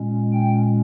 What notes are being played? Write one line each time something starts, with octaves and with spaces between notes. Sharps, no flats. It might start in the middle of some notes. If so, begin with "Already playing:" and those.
Already playing: A#2 G#3 C#4
G5